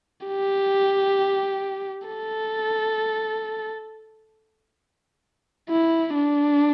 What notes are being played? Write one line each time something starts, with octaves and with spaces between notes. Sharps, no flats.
G4
A4
E4
D4